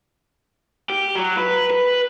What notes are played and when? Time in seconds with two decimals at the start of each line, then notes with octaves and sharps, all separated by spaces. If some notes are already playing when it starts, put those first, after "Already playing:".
0.90 G4
1.16 F#3
1.37 B4
1.70 B4